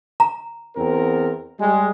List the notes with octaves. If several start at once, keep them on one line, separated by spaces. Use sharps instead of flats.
A#5
E2 C4 A#4
G3 G#3